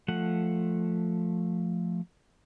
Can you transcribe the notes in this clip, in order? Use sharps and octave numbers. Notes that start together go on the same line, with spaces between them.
F3 A3 F#5